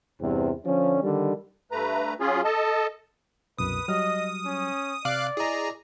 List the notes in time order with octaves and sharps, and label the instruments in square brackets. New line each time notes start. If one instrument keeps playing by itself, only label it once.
[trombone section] E2 G2 C3 C4
D3 F3 C#4
D3 D#3 G3
[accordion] G2 A3 B4 A#5
F#3 C#4 F4 G#4
A4 D#5 A5
[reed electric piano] C2 F#2 B2 [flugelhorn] B4 [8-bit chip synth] D#6
[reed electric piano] F#3 G3 F6 [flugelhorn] D#5
[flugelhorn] C#4
[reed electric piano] C3 [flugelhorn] D5 [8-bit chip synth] F5 D6 F#6
[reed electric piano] E4 D#5 [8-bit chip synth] G#4 A#5